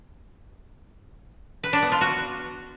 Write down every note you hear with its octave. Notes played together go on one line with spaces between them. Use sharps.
B4
D4
B3
F4
F#4